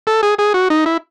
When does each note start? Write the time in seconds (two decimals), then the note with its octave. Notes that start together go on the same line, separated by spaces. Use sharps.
0.07 A4
0.23 G#4
0.39 G#4
0.54 F#4
0.70 D#4
0.86 E4